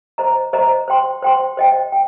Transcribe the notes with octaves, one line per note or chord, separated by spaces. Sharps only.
C5 D#5 A#5
C5 D#5 A#5
C5 G5 C6
C5 G5 C6
C5 D#5 G5
G5